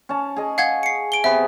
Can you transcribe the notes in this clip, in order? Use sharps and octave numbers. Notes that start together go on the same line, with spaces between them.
C#4 A5
G#4 D#5
F5 F#5 G#6
C7 C#7
D7 G7
C3 B3 E5